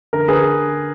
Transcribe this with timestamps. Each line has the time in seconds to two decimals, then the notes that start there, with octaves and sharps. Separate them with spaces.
0.13 D3 A#4
0.28 D3 G#4 B4